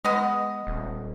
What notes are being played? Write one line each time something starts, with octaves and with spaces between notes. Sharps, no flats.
G#3 B3 D#5
D#1